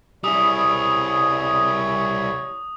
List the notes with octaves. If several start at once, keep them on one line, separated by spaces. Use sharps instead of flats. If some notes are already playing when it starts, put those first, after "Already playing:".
G3 E4 G#4 C#5 D#6